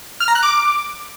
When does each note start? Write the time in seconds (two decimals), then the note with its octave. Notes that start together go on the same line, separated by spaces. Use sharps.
0.20 F6
0.28 A#5
0.35 F#6
0.43 D6